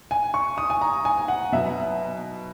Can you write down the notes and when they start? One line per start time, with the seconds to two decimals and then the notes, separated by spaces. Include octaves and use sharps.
0.11 G#5
0.34 C#6
0.58 D#6
0.70 G#5
0.81 A#5
1.05 G#5
1.28 F#5
1.52 B2 F#3 B3 E5